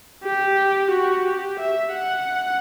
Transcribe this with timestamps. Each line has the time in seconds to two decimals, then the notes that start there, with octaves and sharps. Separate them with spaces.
0.23 G4
0.91 F#4
1.26 G4
1.60 E5
1.95 F#5